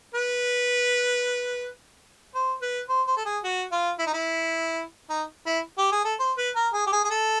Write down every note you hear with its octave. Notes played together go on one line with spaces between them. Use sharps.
B4
C5
B4
C5
C5
A4
G#4
F#4
F4
E4
D#4
E4
D#4
E4
G4
G#4
A4
C5
B4
A#4
G#4
G4
G#4
G#4
A4